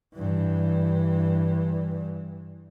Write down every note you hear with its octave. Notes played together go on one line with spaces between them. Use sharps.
G2 E3